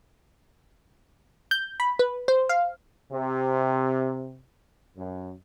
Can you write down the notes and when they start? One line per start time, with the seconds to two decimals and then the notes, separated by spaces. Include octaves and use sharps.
1.51 G6
1.80 B5
1.99 B4
2.28 C5
2.49 F5
3.10 C3
4.96 F#2